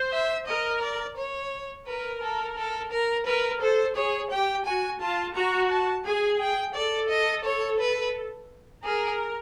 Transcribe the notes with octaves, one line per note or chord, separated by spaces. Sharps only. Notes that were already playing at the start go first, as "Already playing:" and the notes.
Already playing: C5
E5
A#4 D#5
D5
C#5
A#4 B4
A4
A4
A#4
A#4 B4
A4 C5
G#4 C#5
G4 G5
F#4 G#5
F4 A5
F#4 A#5
A5
G#4 G#5
G5
A4 D5
D#5
C#5
B4
G#4 A#4